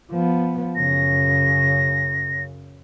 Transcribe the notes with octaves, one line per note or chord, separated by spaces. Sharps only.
F3 B3
F#2 C#3 A#6